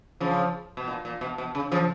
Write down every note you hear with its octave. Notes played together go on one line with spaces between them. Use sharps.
C#3 F3
B2
A#2
A#2
B2
B2
C#3
C#3 F3